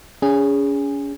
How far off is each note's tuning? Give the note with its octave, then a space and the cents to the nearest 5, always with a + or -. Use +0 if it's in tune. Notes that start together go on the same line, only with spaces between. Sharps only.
C#4 +35 G#4 -15